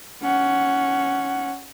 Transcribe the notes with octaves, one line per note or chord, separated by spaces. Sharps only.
C#4 F#5